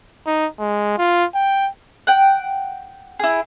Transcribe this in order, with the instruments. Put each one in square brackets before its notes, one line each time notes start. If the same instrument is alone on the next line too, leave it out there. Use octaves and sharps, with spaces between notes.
[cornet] D#4
G#3
F4
G5
[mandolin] F#5 G5
E4 G#4